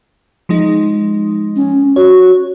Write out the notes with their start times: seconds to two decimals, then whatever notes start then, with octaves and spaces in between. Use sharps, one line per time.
0.49 F3 G#3 D#4
1.56 C#4
1.96 F#4 C#5